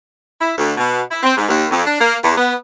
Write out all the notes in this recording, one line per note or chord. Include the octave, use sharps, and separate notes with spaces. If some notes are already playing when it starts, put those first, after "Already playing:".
E4
D2
B2
E4
C4
G#2
D#2
F2
D4
A#3
E2
B3